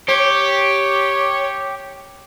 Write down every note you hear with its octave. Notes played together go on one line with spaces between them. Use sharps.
G4 C#5